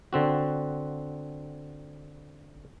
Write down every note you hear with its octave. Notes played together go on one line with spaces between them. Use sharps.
D3 C4 F#4